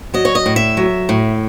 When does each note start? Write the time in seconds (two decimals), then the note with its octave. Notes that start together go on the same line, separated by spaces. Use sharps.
0.14 F#3 D#5
0.25 C#5
0.35 D#5
0.46 A2
0.56 E5
0.77 F#3
1.09 A2